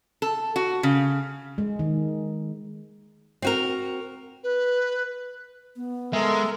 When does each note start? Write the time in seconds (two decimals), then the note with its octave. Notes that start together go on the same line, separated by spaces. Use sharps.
0.22 A4
0.56 F#4
0.83 C#3
1.58 G#3
1.79 D#3
3.42 C4 F#4 A#4
4.44 B4
5.77 B3
6.13 G#3 A4 A#4 E5